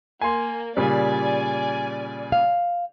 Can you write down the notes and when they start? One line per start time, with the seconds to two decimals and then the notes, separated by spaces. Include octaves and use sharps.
0.21 A#3 G#5 C6
0.77 A#2 C#3 G3 D5 G#5
2.32 F5